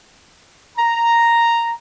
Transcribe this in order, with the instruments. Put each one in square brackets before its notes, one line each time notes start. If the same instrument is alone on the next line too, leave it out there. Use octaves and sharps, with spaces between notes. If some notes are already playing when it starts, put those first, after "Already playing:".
[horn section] A#5